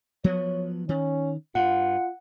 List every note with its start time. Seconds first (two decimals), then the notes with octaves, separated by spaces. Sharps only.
0.24 F3 F#3 B3 C#5
0.89 D#3 C#4
1.55 G2 F4 F#5